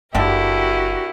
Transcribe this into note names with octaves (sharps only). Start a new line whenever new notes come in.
F#1 D3 G3 E4 F#4 G4 A4 A#4